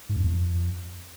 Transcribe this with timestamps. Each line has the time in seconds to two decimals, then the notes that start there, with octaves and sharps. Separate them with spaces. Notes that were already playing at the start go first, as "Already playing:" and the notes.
0.09 G#2
0.17 F2
0.24 E2
0.31 F2